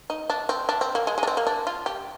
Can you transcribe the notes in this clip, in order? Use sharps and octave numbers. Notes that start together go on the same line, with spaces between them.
D#4
D4
C4
D4
C4
A#3
G#3
G#3
D4
C4
A#3
D4
F4
G4